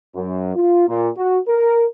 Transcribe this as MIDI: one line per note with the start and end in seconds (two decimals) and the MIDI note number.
0.15 0.53 42
0.55 0.85 65
0.88 1.09 46
1.17 1.39 66
1.48 1.85 70